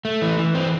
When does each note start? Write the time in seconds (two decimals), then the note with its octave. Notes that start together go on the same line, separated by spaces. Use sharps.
0.05 A3
0.22 E3
0.39 E3
0.55 C4